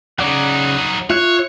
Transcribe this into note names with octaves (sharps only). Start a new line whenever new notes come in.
C#3 F#3 D#4 D5 F#5
F4 C#5 E5 F#6